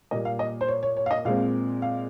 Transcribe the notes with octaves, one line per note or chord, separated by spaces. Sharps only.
A#2 G3 A#3 D#5
F5
D#5
C5
C#5
C#5
C#5
F5
D#5
A#2 G#3 C4 F5
F5